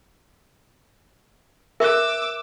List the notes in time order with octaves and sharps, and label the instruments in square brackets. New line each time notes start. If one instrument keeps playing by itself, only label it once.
[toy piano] A#4 [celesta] E5 F#6 [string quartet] D6 E6